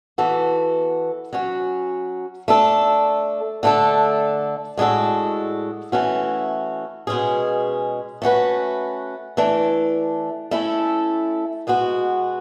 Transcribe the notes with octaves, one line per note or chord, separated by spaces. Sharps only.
E3 B3 F#4 A4
F#3 C#4 F#4
A3 D4 A4
D3 A3 D4 A4
A2 G#3 D4 F#4 A4
E3 A3 C#4 F#4
B2 G#3 C#4 G#4
A3 C#4 F#4 B4
E3 A3 D4
A3 C#4 E4 A4
B2 G#3 B3 F#4